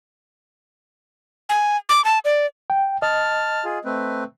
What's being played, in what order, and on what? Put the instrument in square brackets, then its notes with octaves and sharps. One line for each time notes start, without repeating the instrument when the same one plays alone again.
[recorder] G#5
D6
A5
D5
[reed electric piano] G5
[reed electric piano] D#5 [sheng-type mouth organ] A5 F6
[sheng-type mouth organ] F4 G#4
A3 C4 B4